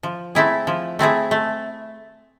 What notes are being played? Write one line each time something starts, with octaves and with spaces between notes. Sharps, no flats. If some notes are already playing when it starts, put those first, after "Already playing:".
F3
A3 C4 E4 G#4
F3
A3 C4 E4 G#4
A3